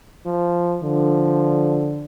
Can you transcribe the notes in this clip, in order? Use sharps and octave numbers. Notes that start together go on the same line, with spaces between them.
F3
D3 F3